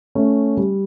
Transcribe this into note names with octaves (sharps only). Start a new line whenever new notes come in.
A3 C#4
G3